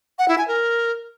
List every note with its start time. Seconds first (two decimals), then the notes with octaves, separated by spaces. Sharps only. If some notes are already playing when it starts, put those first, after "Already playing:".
0.19 F#5
0.28 E4
0.38 G#5
0.48 A#4